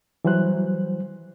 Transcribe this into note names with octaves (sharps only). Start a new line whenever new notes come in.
E3 F#3 G3 C5 F#6